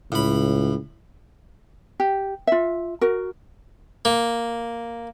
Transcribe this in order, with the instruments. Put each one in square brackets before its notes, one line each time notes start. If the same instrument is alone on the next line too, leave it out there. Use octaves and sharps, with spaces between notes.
[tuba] C#2 [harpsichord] A2 B5
[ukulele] G4
F4 E5
F#4 A#4
[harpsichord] A#3